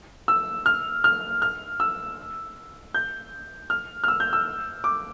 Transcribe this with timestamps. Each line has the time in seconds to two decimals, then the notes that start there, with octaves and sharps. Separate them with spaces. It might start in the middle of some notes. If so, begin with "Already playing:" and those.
0.28 E6
0.66 F6
1.04 F6
1.42 F6
1.80 E6
2.94 G6
3.70 F6
4.04 F6
4.08 E6
4.20 G6
4.33 E6
4.84 D6